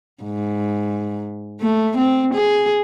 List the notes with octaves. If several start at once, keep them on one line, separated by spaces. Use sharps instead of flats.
G#2
A3
C4
G#4